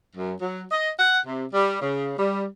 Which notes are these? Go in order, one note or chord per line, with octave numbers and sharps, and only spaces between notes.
F#2
F#3
D#5
F#5
C3
G3
C#3
G3